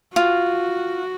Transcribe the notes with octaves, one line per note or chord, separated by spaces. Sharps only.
F4 F#4